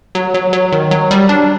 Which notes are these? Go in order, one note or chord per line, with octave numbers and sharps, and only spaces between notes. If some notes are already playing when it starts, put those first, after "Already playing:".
F#3
F#3
F#3
D#3
F#3
G3
D4